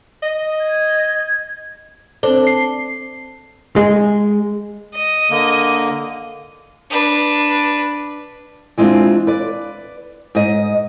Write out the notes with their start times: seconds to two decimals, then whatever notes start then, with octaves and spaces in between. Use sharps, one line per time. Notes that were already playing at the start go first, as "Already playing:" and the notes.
0.23 D#5
0.60 G#6
2.23 C4 D4 A4 C5
2.47 C7
3.76 G#3
4.95 D#5
5.30 D3 A#3
6.90 D4 B4
8.78 E3 G#3 C4 D4 F4
9.27 B4 D5
10.35 G#2 D#5